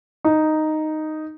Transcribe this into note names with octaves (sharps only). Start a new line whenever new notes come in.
D#4